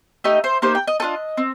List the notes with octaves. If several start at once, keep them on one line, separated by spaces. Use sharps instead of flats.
A3 D#4 G4 D#5
C5
A#3 D#4 G4 C5
G5
D#5
D4 F4 A4 D#5
C4